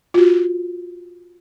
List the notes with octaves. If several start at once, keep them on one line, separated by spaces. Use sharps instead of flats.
F4 F#4